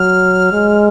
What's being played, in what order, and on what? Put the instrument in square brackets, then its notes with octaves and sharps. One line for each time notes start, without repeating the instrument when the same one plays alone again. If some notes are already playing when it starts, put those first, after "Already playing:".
Already playing: [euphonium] F#3 [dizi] F6
[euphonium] G#3